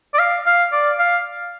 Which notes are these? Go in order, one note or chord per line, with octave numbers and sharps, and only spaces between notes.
D5
F5
F5
D5
F5